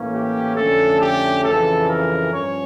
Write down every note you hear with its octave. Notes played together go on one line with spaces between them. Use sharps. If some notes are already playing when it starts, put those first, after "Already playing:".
Already playing: A2 E3 A#3 C#4
G4
F2 D3 A3 C#4 A4
G4
F2 C#3 E3 A4
A#4
G2 F3 C#4 C#5